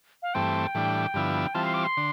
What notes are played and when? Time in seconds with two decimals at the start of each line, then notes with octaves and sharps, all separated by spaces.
0.22 F5
0.34 G2 E3 A3 C4 G5
0.75 A2 E3 G3 D4
1.14 G2 D3 F3 B3 E4
1.54 E3 G3 C4 F4 A5
1.65 C6
1.74 D6
1.84 C6
1.97 D3